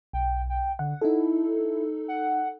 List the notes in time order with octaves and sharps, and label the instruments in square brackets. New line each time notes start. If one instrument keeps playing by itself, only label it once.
[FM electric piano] B1 [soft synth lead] G5
[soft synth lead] G5
[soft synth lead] D3 [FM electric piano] F#5
[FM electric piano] D#4 A4 [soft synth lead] E4
[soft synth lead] F#5